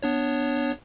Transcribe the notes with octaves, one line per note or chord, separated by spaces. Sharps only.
B3 D4 C#5